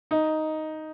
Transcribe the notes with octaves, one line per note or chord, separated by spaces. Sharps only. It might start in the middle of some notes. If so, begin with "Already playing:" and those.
D#4